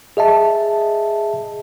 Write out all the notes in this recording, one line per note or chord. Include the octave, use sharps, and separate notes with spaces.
G#4 D#5 E5 A5